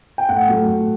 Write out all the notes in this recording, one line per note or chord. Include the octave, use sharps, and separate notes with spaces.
G5
A2 F#5
F#3 A3
A2